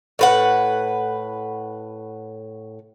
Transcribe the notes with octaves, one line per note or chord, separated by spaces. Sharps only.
A2 B4 F#5